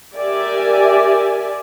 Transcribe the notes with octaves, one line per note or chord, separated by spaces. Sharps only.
G4 A#4 D5 E5 G#5